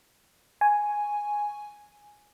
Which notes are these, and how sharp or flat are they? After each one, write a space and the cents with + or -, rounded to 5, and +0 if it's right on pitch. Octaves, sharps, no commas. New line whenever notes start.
G#5 +0 C#6 +0